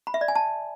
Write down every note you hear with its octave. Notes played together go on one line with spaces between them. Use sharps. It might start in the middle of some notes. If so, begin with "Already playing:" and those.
B5
E5
D5
G#5
A5